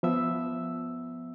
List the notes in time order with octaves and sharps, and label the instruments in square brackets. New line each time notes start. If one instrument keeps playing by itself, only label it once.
[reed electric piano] F3 B3 E5 E6